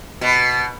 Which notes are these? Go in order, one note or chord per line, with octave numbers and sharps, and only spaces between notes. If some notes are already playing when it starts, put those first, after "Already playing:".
B2